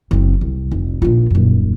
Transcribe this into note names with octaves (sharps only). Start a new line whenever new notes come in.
F#1 C4
C2
F1
A#1 F4
D#1 F#2